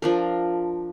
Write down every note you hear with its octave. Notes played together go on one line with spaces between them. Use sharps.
F3 D4 A#4